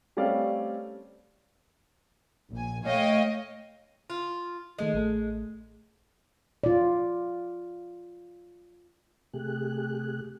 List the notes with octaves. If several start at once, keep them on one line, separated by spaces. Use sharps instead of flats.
G3 A3 C4 C#4 D5 F5
A#1 G#5
A3 C#5 D#5 F5 G5
F4
D#3 G#3 A3 D#5
A1 A3
F4 D5
C3 A3 G4 G#4 F#6